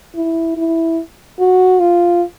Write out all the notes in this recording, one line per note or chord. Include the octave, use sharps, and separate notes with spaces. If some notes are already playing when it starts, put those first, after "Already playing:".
E4
E4
F#4
F4